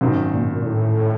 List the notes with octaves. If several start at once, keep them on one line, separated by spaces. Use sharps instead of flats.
G#1 F#2 B2 D#3
A#2
A#2
A2